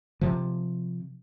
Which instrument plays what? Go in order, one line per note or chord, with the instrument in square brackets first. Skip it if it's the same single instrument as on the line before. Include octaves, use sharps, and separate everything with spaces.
[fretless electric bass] C3 F3